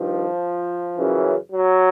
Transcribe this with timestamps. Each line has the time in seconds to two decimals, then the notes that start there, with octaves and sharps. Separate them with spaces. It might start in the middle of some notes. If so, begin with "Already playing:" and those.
Already playing: G2 D#3 F3
0.96 F#2 C#3 E3
1.51 F#3